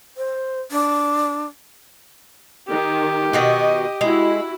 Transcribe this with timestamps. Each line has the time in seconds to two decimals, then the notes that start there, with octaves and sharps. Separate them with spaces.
0.17 C5
0.71 D4
2.68 D#3 G4
3.33 B2 D#3 F#4 D#5
4.01 G#3 E4 F#4